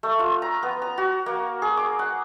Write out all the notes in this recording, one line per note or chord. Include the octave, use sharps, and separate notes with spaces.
A3
F4
A#5
B3
A#5
F#4
A#3
G#4
D6
F#5